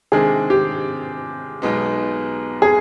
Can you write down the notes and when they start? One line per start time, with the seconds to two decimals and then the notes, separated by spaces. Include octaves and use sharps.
0.12 C3 D#3 G#3 D4 G#4
0.50 G4
1.62 B1 B2 G#3 B3 D#4
2.62 G#4